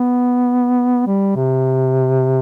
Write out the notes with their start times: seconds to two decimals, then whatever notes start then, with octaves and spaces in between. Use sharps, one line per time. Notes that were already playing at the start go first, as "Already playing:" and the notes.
Already playing: B3
1.07 G3
1.35 C3